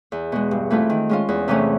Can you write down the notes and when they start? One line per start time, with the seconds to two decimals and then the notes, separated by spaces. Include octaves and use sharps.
0.12 E2
0.32 B2 G#3
0.51 G2
0.71 E3 A3 C4 F4
0.90 D#3
1.09 G#3 C#4 F4
1.29 E2
1.48 C3 E3 A3 C#4